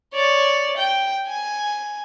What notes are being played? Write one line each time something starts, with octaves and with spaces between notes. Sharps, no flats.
C#5 D5
G5
G#5